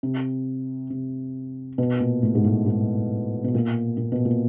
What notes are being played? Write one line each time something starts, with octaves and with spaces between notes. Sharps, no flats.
C3
C3
B2
A#2
A2
G#2
A2
G#2
B2
A#2
A#2
B2
A#2